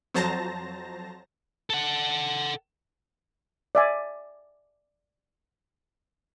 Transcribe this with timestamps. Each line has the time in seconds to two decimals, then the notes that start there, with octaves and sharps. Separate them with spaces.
0.14 F2 F#3 C5 A5 A#5 A#6
1.70 A4 F#5
3.75 D5 E5 G#5